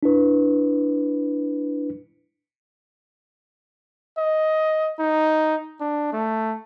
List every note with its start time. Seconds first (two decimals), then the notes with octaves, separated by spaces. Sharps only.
0.03 D4 E4 B4
4.18 D#5
4.99 D#4
5.80 D4
6.13 A3